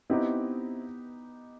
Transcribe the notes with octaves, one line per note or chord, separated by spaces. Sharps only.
B3 C4 D#4 E4 G4 D#5